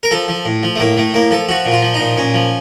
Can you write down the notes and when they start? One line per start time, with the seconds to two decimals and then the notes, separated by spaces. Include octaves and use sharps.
0.03 A#4
0.11 F3 A4
0.28 F3
0.45 A2
0.63 F3
0.76 A3
0.80 A2 A#3
0.97 A2 A3
1.14 A2 A#3
1.31 F3 A4
1.49 F3 F#4
1.66 A#2
1.71 F4
1.82 F3
1.94 D#4
2.00 A#2
2.17 A#2 C#4
2.34 F3